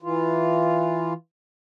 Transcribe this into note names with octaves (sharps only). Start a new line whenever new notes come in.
E3 F4